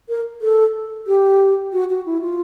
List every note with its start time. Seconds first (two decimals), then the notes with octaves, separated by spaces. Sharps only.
0.09 A#4
0.42 A4
1.07 G4
1.73 F#4
1.89 F#4
2.06 E4
2.22 F4